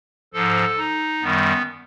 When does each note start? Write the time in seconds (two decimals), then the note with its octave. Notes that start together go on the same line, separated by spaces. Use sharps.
0.34 G#2 F3 A4
0.77 D#4
1.22 F#2 D#3 G3 B3